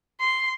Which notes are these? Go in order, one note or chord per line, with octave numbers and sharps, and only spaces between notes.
C6